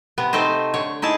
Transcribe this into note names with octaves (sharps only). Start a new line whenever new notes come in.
C3 B3
A3 C4 D#4 C5 D#5
D3 C#5
D#4 E4 G#4 A5